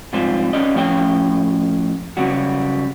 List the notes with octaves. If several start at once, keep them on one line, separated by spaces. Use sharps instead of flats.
F2 G#2 G3 F4 C5
C#4 G4 D5 D#5
A2 F3 C#4 G5
C#3 F#3 G3 F#4